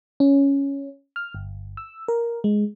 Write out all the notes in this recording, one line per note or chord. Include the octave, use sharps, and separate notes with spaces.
C#4
F6
G1
E6
A#4
G#3